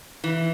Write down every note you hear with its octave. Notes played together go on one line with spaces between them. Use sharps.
E3